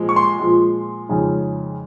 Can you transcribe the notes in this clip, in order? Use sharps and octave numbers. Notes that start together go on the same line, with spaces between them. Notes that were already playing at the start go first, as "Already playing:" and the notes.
Already playing: A#2 F3 G#3
C#6
C6
A#2 F3 G#3
F2 C#3 G#3 D#4